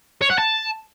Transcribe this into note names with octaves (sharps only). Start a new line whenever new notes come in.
C#5
F#5
A5